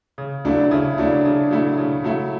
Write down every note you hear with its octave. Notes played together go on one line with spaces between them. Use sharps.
C#3
F#3 A3 D4 E4
C#3 E4
F#3 A3 D4 E4
C#3
F#3 A3 E4
C#3
F#3 A3 E4